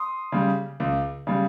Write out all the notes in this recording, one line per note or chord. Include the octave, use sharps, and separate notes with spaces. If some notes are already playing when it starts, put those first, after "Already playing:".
Already playing: C6 D#6
C#3 G3
C#2
C#3 G3